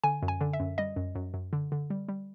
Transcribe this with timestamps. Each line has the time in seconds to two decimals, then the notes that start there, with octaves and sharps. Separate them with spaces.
0.04 D3 G#5
0.22 F#2
0.28 G#5
0.41 D3
0.53 E5
0.60 F#2
0.78 G3 D#5
0.96 F#2
1.15 F#2
1.34 F#2
1.53 D3
1.72 D3
1.90 G3
2.09 G3